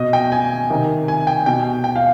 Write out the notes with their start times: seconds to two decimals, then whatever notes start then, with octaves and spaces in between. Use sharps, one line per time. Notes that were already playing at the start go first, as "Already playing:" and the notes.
Already playing: B2 D#5
0.13 G5
0.32 G#5
0.70 C3 D#3
1.08 G#5
1.27 G5
1.46 B2 G5
1.84 G5
1.96 F5